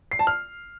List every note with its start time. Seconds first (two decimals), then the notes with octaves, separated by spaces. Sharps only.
0.11 C7
0.19 A5
0.27 F6